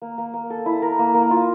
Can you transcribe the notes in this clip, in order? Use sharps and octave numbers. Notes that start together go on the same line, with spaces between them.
A#3
A#3
A#3
A4
E4
A#4
A#3
A#3
F4